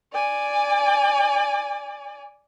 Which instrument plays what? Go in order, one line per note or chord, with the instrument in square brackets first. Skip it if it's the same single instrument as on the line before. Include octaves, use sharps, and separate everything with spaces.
[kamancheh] D5 G#5